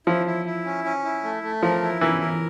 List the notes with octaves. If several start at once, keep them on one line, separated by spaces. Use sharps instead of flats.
F3 E4
E4
E4
C#4
C#4
E4
A3
A3
F3 A#4
E4
E3 A#4
A#4